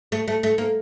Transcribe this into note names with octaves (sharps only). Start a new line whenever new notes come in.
A3
A3
A3
A#3